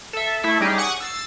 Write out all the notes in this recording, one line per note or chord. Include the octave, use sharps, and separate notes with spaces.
A4 E5
A3 E4 A4 E5
G3 C#4 D#4 G4 G#4
F#5 G#5 C#6 D#6 D7 D#7
E6 A6 C7